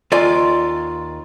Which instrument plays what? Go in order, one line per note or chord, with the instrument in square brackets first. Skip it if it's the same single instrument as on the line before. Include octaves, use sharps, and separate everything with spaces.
[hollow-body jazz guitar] D#2 F4 D5 G#5